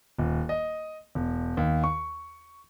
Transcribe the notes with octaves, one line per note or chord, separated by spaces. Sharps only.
D#1
D#5
E1
D#2
C#6